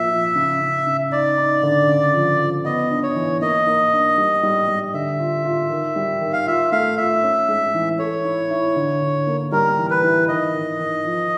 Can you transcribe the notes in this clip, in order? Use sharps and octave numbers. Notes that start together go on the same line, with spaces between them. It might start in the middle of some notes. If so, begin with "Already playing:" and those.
Already playing: A#2 F3 E5
F3
C#3
C#3
C#3
D#4 D5
D#4
D3
C#3
F3
F3
B3 D#5
D4
C#5
E3
A#3 D#5
A#3
D4
G3
G3
G3
D3 E5
F4
F4
D#3
G3
D#3
F5
F4 E5
A3 F5
F4 E5
C#4
G#3
E3
A4 C#5
E4
E4
D3
D3
A#3
G3 A#4
E3
B4
E3
D#3 D#5
D#3
D#3
F3